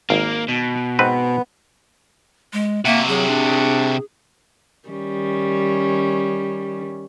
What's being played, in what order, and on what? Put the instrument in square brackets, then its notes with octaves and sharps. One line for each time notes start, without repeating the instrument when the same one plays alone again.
[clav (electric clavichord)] G#1 F5 [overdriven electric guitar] A#3
[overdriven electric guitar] B2
[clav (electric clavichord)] G#2 C4 B4 [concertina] B3
[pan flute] G#3
[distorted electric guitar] C3 F#4 [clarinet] A#3 [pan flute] E5
[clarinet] F#3 [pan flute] G#4
[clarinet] D4
[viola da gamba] D#3 G3 C#4